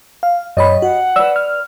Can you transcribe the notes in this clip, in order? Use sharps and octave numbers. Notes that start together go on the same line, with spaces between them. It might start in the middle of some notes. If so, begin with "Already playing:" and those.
F5
F#2 G4 C#5 D#5 B5
F#4 F#5
B4 D5 E6
F6